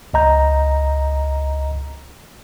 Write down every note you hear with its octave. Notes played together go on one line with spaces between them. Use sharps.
C#2 D#5 A#5 G6